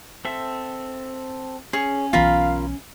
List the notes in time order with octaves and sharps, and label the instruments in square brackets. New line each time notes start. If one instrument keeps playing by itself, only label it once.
[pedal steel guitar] C4 A4 E5
[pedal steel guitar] C#4 [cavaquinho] G#4 C#5
[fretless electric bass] B1 E3 B3 [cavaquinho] F4 A#4 B5 [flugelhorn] F5